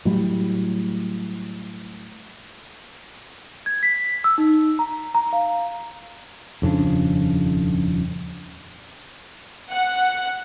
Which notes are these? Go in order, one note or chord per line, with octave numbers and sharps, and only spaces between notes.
A2 F#3 G3
G#6
B6
E6
D#4
A#5
A#5
F5
D#1 F2 C#3 D4
F#5